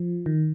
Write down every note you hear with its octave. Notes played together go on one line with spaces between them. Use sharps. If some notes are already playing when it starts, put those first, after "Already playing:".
Already playing: F3
D#3